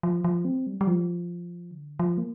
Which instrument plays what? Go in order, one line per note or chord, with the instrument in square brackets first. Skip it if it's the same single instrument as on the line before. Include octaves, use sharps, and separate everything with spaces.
[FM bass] F3
F3
C4
G3
G3
F3
D3
F3
A#3